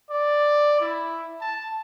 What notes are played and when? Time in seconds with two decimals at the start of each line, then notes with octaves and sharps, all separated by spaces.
0.10 D5
0.80 E4
1.41 A5